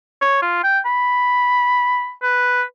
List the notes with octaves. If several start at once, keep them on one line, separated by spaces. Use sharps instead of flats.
C#5
F4
G5
B5
B4